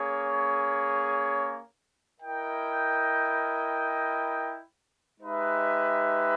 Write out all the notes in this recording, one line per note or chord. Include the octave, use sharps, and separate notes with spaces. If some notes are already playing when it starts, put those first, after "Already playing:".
Already playing: A#3 C#4 G#4 C#5
E4 A#4 D#5 G5
G#3 D#4 G4 B4 E5